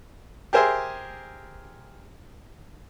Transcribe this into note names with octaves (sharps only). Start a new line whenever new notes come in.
G4 G#4 A#4 C5 E5 G#5